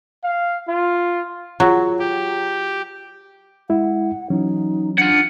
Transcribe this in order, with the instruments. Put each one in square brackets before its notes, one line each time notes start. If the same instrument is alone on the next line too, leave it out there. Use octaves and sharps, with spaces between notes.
[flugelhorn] F5
F4
[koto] F#3 [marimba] F4 G#4
[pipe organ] G4
[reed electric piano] G#3 E4 [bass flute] F#5
[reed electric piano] E3 F#3 C#4 [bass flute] D#4
[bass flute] D4 [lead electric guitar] F4 F#5